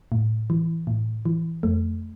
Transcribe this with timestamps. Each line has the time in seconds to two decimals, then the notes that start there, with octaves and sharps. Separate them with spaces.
0.12 A2
0.50 E3
0.87 A2
1.25 E3
1.63 F2 A3